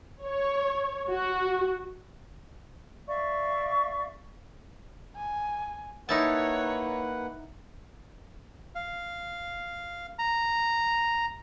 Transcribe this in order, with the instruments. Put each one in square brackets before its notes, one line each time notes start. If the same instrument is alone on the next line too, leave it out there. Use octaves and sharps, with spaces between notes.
[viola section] C#5
F#4
[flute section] D5 E5 F5 C#6
[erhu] G#5
[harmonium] A#3 B4 F#5 [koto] D#4 E4 A5 [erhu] C#5
[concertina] F5
A#5